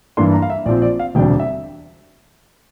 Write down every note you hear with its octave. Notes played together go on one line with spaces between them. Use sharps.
G2 E3 A#3 D4 C6
A#5
F5
E5
A#1 A#2 F3 C4 D5
D5
F5
E1 D2 C3 G3 D4 G5
E5